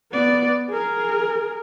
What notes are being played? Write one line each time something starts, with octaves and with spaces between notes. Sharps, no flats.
B3 D5
G#4 A#4